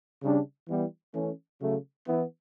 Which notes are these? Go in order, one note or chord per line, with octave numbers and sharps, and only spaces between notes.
C#3 G3 D4
E3 G3 B3 E4
E3 A3 C#4
C#3 F#3 A3
E3 B3 E4